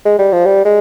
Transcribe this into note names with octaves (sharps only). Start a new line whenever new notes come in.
G#3
G3
F3
G3
G#3